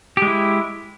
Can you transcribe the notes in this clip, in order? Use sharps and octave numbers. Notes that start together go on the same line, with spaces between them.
G#3 E4 G4